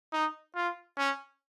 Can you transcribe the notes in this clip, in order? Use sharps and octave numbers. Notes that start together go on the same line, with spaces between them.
D#4
F4
C#4